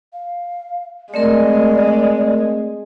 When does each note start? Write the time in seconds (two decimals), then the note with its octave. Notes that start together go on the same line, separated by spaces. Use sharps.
0.13 F5
1.14 G#3 A3 C4 A#4 D5